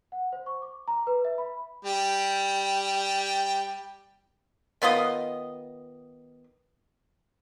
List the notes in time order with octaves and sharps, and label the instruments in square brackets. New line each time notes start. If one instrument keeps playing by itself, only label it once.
[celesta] F#5
C5
C#6
D6
A#5
B4
E5
B5
[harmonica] G3 G5
[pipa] D#3 B3 F4 D#5